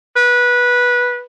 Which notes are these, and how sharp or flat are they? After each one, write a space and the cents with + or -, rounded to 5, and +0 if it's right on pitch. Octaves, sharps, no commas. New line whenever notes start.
B4 -15